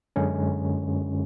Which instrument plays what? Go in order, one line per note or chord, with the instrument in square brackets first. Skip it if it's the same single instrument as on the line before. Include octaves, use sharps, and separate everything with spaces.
[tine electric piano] F#2 D3 G#3 C#4